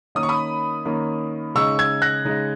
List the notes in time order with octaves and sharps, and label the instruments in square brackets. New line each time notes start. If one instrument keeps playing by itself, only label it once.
[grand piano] D#3 A#3 C#4 D#6
C#6
B5 D#6
D#3 A#3 C#4
C#3 G#3 D#4 C#6 E6
E6 G#6
F#6 A#6
C#3 G#3 D#4